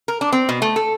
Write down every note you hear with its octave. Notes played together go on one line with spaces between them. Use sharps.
A#4
D4
C4
B2
A3
A4